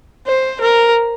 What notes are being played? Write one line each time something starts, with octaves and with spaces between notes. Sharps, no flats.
C5
A#4